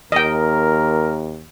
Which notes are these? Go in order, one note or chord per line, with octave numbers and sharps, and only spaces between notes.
D#2 A#4 D#5 G5